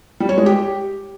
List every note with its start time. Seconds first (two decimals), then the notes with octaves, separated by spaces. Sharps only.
0.20 G3
0.29 C#5
0.38 G#3
0.46 G4